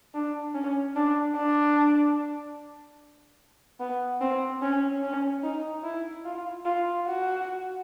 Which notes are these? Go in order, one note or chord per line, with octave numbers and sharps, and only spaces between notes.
D4
C#4
D4
D4
B3
C4
C#4
C#4
D#4
E4
F4
F4
F#4